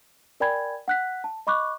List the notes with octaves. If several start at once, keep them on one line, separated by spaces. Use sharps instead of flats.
A#4 D5 G5 G#5 B5 G#6
F#5 F#6 B6
A5
D#5 B5 C#6 D6 F#6